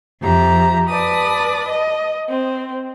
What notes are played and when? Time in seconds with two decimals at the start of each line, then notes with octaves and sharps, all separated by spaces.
0.22 F2 G4 E5 A#5
0.88 B4 D5 A5 D#6
1.69 D#5
2.28 C4